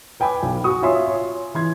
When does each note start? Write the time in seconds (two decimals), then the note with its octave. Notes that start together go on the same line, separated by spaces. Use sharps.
0.20 B4 G5 G#5 B5 D6
0.43 B1
0.64 F#4 C#6 D#6
0.82 F4 C#5 E5 G#5 C6
1.06 C#5
1.54 E3 C6 G#6